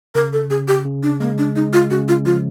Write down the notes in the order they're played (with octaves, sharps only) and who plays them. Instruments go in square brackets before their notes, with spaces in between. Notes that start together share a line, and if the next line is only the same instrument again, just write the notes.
[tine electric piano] C#3 [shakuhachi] A#4
[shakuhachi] A4
[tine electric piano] C#3 [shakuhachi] G#4
[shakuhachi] G4
[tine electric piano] C#3
[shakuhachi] D4
[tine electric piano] G#3 [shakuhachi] A#3
[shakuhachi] D4
[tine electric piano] G#3 [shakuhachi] D#4
[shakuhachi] F4
[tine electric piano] C#3 [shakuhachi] F#4
[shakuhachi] F4
[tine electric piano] F3 [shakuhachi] F4